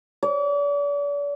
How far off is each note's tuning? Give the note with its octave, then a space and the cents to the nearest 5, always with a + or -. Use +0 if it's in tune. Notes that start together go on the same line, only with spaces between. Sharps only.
D5 -40